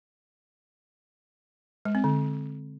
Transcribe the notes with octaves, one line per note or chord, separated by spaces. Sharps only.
G#3
C4
D3